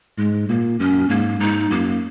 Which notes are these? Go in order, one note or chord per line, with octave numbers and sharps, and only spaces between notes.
G#2 G#3
A#2 A#3
F#2 C#4
G#2 A#3
G#2 D#4
F#2 A#3